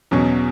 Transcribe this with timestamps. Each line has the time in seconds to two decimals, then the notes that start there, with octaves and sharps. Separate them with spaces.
0.11 E2 B2 F#3 C#4